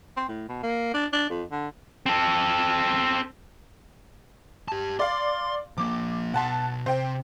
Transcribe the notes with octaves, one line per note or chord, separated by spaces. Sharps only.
C4
A2
B2
A#3
D4
D4
F2
D3
C4 A4
G4 A5
D5 F5 C6
F3 A#3 D6
B2 F#5 A5 C6
C3 C5 G5